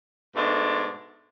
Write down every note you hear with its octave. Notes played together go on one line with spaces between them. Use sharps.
G#2 B2 A3 D4